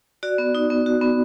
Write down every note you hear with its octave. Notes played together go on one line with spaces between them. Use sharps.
F#4 D5
B3
D#4
B3
F#4
B3